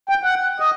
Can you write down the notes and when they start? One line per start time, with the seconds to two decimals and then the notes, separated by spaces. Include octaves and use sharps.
0.09 G5
0.24 F#5
0.60 D#5